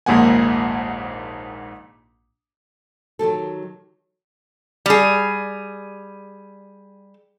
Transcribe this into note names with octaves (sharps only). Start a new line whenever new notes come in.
A#1 D#2 G#2 A#3 F#5 G#5
D#3 F#3 G4 A4
G3 G#4